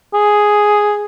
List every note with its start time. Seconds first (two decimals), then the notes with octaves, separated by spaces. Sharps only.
0.14 G#4